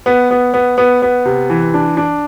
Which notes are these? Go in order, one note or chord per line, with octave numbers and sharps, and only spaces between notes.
B3
B3
B3
B3
B3
C3
E3
D4
D4